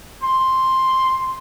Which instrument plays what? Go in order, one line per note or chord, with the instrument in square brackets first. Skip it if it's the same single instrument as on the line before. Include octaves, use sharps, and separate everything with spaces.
[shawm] C6